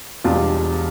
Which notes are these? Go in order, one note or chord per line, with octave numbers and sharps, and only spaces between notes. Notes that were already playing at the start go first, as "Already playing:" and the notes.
E1 E2 B2 G3 D4 F4